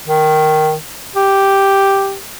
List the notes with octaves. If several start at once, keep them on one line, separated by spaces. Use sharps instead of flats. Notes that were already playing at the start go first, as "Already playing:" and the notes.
D#3
G4